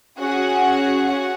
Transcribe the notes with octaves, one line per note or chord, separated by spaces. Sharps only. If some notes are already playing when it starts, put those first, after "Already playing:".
C#4 F#4 G#4 F#5
F#4 F#5